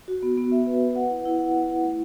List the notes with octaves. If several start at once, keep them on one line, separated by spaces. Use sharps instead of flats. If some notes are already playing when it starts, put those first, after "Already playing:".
F#4
B3
B3
E5
B4
B4
F#5
E4
E4
F#5
F#5
E4
A3